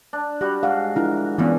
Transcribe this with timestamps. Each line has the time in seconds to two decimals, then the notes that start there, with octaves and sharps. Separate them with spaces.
0.13 D4
0.41 G3 F#4 G4
0.63 G#2 F5 F#5
0.96 D4 E4 F4 A#4
1.38 G2 A#2 C#3 E3 B3 C#4